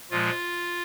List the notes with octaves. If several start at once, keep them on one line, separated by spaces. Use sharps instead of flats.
A#2 F3 G#3 F4